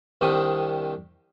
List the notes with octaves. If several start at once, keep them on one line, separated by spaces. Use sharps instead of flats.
C2 C3 D#3 D4 D#6